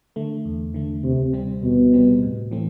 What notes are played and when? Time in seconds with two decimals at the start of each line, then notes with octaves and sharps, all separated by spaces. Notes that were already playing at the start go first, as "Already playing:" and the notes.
0.16 D3 A3
0.45 E2
0.74 D3 A3
1.04 D2 C3
1.33 C3 G3 C4
1.63 D2 B2
1.93 C3 G3 C4
2.22 A2
2.51 E3 A3 C4